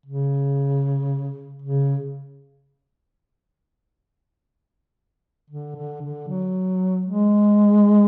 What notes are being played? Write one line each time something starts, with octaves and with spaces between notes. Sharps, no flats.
C#3
C#3
D3
D3
D3
F#3
G#3